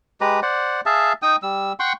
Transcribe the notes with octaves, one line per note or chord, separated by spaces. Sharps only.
G#3 G4 B4 A#5
C5 D5 F#5
G#4 E5 F5 A5
D#4 G5 D#6
G3 E6
F#5 G5 C6 C#6